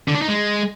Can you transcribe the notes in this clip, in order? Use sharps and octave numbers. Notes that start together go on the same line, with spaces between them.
D3
D4
D#4
G#3